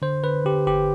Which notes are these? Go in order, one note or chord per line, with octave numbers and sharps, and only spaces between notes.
D3 C5
D3 B4
D3 G4
G1 G4